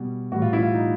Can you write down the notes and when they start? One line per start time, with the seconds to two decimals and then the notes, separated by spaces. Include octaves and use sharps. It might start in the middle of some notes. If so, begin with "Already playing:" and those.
Already playing: B2 G3
0.32 A2 E3 G3 F#4
0.42 F4
0.53 E4
0.63 F4
0.74 D#4